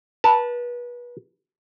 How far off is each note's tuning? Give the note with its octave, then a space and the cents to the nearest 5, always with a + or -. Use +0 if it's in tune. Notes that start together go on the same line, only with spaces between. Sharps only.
B4 -30 A5 +0